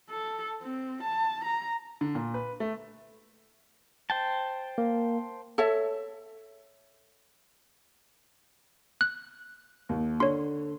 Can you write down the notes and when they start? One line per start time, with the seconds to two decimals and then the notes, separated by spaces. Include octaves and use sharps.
0.10 A4
0.62 C4
1.03 A5
1.45 A#5
2.01 D3
2.15 A#2
2.34 B4
2.60 A3
4.10 C5 G5 A5
4.78 A#3
5.58 A4 C#5 E5
9.01 F#6
9.89 D#2
10.20 D3 C#5 C6